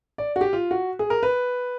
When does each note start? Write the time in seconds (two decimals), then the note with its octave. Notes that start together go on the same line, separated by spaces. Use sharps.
0.18 D5
0.36 F#4
0.41 G4
0.53 F4
0.71 F#4
0.99 G#4
1.10 A#4
1.23 B4